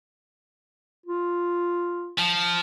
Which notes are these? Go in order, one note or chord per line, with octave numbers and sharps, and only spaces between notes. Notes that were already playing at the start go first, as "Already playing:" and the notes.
F4
F3